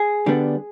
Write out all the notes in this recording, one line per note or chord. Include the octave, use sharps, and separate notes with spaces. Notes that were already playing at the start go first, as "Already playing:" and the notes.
Already playing: G#4
D3 G3 B3 D4